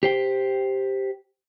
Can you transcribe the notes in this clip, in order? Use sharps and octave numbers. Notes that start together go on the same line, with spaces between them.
G4 C5 G5